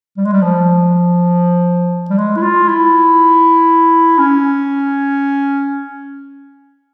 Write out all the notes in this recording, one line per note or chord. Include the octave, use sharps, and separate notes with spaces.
G3
G#3
G3
F3
G3
G#3
E4
F4
E4
C#4